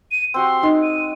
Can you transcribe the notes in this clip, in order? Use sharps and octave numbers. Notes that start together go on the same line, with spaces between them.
D#7
C4 F#4 G4 C6
G#3 D#4
D#7